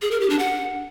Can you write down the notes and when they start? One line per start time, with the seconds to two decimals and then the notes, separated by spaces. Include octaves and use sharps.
0.02 G#4
0.11 A#4
0.20 G4
0.30 D4
0.39 F#5